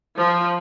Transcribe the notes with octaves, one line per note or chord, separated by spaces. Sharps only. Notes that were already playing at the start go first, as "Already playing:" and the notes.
F3